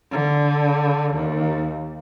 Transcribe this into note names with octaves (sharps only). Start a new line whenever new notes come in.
D3
D#2